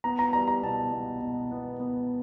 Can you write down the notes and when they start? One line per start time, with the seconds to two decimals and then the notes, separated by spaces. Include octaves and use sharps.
0.04 B3 A#5
0.19 A#5
0.33 G3 A#5
0.48 A#5
0.63 B2 A5
0.93 B2
1.21 B2
1.51 B3
1.80 B3